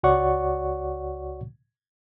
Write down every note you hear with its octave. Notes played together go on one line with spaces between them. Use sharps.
C#2 F#4 C#5 D5 F#5 C#6